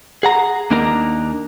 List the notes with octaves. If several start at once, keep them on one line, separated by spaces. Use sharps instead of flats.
G#4 F#5 A#5
D#2 A#3 D4 D#4 A#4 A#5